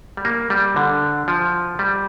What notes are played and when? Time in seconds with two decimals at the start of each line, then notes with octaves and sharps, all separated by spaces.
0.17 G3
0.25 A#3
0.50 G3
0.76 D3
1.28 F3
1.79 G3